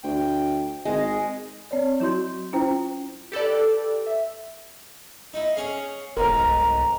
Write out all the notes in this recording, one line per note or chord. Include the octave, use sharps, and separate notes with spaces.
D2 G5
G#1 G#3 D#5
C4 C#5 D5
F#3 E4 F#4 C6 G6
C#4 E4 F4 C5 G5 A#5
G4 A4 B4 D5
E5
D#4 E4
C#4 G#4 F5
E1 B1 G#2 A#4 A#5
C2